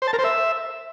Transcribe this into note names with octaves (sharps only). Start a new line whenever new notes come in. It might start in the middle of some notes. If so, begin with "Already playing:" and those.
C5
A5
A#4
C5
E5